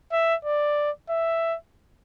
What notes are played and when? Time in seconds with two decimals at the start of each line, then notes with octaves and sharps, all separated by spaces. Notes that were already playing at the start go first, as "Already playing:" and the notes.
0.12 E5
0.45 D5
1.10 E5